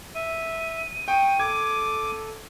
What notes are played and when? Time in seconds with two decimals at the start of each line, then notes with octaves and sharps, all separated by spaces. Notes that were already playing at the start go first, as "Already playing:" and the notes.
0.15 E5 D#7
1.08 G5 C#6 D#6
1.40 A4 D6 G#6